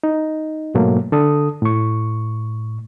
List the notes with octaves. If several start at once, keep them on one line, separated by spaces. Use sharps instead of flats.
D#4
G#2 B2 F#3 A3 A#3
D3 A4 D#6
A2 C#6